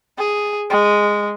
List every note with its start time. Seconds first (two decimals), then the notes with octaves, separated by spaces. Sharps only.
0.18 G#4
0.70 G#3